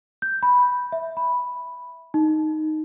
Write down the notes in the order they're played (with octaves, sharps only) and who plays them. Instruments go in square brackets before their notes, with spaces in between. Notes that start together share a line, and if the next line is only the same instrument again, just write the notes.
[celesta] G6
B5
E5
B5
D#4